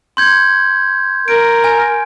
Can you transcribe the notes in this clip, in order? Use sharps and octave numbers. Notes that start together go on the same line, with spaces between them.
C6 G6 G#6
A#4 D7
G#5